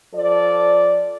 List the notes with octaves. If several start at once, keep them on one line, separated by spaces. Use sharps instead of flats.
F3 A4 D5